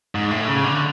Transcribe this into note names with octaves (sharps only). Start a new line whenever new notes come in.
G#2
A2
C#3
D3